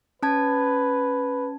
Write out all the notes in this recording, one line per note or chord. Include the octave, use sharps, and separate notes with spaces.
C#4 B4 A5 G#6